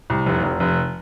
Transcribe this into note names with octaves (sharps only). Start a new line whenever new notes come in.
C2
F1
F1
F1